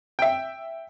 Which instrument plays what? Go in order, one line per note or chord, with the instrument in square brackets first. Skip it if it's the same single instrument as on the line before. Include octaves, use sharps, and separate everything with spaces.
[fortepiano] E5 G5